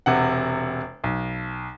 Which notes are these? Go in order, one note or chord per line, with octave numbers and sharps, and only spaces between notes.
E1 C3 F#5
B1